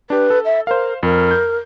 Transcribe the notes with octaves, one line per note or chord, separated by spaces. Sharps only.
D4 G4 B4
A4
E5
A#4 C5 F5
F2 A#4
G6